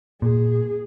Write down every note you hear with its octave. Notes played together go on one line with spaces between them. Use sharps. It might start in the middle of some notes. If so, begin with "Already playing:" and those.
A#2 G#4